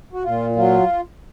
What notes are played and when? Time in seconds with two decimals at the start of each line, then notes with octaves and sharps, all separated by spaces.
0.12 F#4
0.24 A#2 F4
0.56 F#3 F4